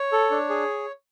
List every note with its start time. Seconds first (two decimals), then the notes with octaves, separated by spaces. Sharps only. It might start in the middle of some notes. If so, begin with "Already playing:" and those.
Already playing: C#5
0.12 A4
0.31 D4
0.49 G#4